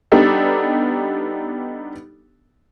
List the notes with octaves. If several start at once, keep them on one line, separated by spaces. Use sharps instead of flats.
G3 B3 D4 D#4 G4 A4